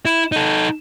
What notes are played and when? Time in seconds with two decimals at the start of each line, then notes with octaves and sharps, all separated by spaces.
0.05 E4
0.32 D#4 A4